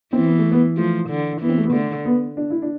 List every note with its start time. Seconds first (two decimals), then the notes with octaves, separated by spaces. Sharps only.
0.13 E3 C4
0.26 B3
0.39 A3
0.52 B3
0.77 F3 A3
1.10 D3
1.41 E3 B3
1.49 C4
1.58 A3
1.65 B3
1.73 D3 A3
2.05 B3
2.37 D4
2.50 E4
2.62 D4